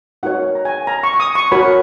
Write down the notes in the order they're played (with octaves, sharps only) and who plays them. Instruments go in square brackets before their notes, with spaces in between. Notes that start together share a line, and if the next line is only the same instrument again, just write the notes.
[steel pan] D#4 F#4 A#4 C#5 F#5
A#5
G#5
A#5
C#6
C#6
D#6
C#6
F#4 A#4 C#5 B5